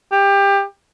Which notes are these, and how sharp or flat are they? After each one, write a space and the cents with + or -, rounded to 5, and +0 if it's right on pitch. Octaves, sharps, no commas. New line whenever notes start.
G4 +25